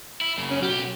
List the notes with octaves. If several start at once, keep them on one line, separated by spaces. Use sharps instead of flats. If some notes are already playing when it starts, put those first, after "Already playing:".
E4
F#2 C#3
C#4
B1 F#4 G4